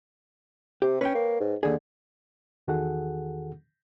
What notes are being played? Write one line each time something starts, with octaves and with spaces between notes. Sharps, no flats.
C3 G4
C#4 B4 C#5 G5
A#3
G#2
D#2 D3 G#4
E2 D#3 F#4 G#4 A4 F#5